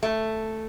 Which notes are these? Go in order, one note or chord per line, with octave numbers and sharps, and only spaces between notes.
A3